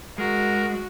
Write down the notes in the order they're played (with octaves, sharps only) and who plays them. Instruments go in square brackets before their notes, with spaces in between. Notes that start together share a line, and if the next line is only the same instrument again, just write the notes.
[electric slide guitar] G#3 [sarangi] F#4 [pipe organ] A#4